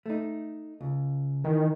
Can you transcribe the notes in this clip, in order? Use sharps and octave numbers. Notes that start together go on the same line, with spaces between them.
A3 D#4
C#2
D#3 E3